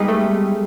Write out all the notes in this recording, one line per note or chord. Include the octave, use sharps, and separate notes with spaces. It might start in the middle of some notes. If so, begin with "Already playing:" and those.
Already playing: G3 G#3 B3 D#4 G4 G#4 B4
A3 A4